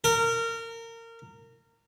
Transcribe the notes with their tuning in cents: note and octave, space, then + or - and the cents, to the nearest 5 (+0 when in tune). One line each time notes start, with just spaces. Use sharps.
A#4 -25